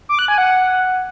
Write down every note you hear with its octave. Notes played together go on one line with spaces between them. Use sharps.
D6
F#6
G#5
F#5